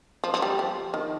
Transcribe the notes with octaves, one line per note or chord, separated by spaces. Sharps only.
F3
F3
G3
F3
D#3